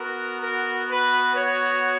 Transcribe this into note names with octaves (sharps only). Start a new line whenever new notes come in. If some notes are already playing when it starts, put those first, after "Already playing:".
Already playing: B3 F#4 A#4
A#4
B4
C#5